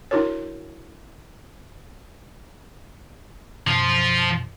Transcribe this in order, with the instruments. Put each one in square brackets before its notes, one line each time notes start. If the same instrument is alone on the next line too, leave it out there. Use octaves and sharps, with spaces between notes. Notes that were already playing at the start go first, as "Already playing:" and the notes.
[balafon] D4 E4 F#4 A#4 C#5
[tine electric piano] F#2 B2 [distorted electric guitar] F3 F4